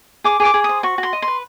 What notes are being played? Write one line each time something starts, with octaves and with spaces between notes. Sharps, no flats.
G#4 D6
G#4
D6
G#4
C5 D#6
F#4 C#6
F#4
C6
D#5
C6
B4